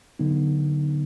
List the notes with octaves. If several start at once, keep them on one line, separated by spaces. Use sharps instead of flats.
D3 F#3 B3 D#4